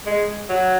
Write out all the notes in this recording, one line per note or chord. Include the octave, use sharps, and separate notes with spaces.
G#3
F#3